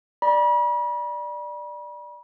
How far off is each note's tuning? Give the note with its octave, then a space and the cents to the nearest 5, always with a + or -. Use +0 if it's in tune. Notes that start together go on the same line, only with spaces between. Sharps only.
D5 +15 B5 -40